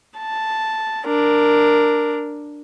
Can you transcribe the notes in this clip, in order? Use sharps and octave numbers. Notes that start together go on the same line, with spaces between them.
A5
D4 A#4